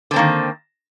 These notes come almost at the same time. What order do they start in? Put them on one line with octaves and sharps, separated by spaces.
D3 C4 A#3 D#3